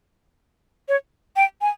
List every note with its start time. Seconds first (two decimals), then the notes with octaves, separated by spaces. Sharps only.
0.89 C#5
1.36 G5
1.61 G#5